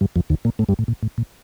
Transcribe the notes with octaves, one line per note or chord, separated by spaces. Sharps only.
G2 G3
F2 F3
D#2 D#3
A#2 A#3
A2 A3
G2 G3
A2
A#2
A2
A#2